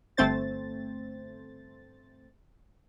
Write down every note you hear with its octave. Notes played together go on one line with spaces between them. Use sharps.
G1 A3 C4 C5 A6